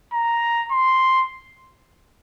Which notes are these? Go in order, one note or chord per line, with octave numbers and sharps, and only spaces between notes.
A#5
C6